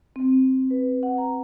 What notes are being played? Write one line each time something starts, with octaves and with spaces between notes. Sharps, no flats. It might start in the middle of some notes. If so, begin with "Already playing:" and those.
C4
B4
F#5
A#5